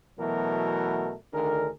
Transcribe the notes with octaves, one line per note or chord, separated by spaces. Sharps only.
B2 E3 F#3 A3 B3 A#4
D2 D3 D#3 G#4 A#4